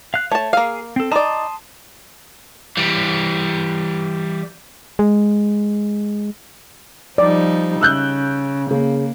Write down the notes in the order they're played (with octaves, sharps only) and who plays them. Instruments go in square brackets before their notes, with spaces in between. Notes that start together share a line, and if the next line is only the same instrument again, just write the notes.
[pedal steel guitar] F5 F#6
[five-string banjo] A3 A5 [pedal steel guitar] C#5
[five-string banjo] A#3 F5 [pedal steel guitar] G#4
[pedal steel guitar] C4 A4
[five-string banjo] D#4 D5 [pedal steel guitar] A5 C6 D#6
[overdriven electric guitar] E3 G3
[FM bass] G#3
[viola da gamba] F3 G3 D#4 [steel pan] D5
[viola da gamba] C#3 [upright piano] E6 F#6 G6
[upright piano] C#3 [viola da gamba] A#3